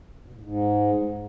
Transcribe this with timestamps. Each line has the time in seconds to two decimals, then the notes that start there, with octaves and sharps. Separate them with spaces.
0.19 E2
0.26 B2
0.34 A2
0.41 G#2